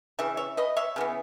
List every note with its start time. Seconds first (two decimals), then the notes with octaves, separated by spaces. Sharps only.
0.19 C#3 E3 E5
0.37 C#5 E5
0.57 B4 D#5
0.76 C#5 E5
0.96 C#3 E3 B3